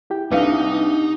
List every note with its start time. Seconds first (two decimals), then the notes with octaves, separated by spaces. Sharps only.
0.10 E4 G4 G5
0.32 C2 D4 D#4 B4 F5 C#7